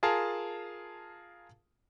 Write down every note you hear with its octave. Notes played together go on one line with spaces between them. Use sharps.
F4 G#4 A#4 F5 A5